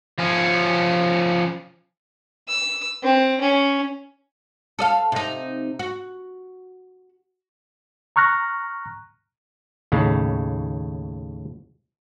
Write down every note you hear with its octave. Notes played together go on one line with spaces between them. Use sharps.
F3 C#4
E6
C4
C#4
A4 D#5 F5
C3 D#4
F#4
A#5 C#6 F6 F#6 A#6
D#2 A2 C#3